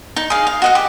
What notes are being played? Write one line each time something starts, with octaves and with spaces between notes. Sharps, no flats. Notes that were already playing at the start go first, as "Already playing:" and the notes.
D#4
G#4 F5
F5
F#4 D#5 F#5
G4